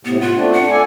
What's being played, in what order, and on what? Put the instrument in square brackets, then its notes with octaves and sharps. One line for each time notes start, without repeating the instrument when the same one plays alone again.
[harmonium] A2 C3 [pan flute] B3
[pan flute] F4 [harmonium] F#5
[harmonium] A3 C4 D4
[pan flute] F#5
[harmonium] A4 D5 G#5